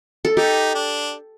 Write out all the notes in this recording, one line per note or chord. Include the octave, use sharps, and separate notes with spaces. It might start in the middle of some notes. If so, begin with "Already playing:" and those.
A4
D#4 G4
D4